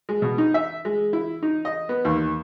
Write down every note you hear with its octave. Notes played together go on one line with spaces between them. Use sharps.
G#3
B2
D#4
E5
G#3
E4
D#4
D#5
B3
D#2